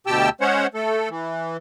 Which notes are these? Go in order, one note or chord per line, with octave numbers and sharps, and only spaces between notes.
D2 B2 G4 G5 A5 E6
G#3 C#4 C5 C#5 F#5
A3 A4
E3